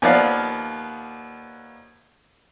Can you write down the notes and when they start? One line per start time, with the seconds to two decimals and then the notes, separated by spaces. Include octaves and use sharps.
0.02 D#2 F3 B3 B4 D5 F5